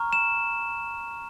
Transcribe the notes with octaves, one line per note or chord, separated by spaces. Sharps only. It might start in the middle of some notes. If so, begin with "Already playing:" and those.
Already playing: A#5 C#6 F6
E7